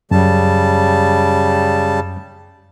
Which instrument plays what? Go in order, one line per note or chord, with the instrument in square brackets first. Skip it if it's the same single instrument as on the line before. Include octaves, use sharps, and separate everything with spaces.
[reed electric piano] F#2 [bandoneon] C#3 G3 A5